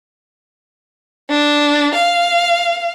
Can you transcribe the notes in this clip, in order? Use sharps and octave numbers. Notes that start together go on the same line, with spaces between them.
D4
F5